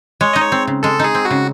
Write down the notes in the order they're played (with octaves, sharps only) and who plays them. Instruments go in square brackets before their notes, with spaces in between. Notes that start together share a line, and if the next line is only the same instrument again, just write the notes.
[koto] G#3 [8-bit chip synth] C#5
[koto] D#4 [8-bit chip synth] D#5
[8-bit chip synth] C#5
[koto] C4
C#3
[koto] G#3 [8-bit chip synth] A4
[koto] D#4 [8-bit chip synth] G#4
[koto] C4
[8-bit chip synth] F#4
[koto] C#3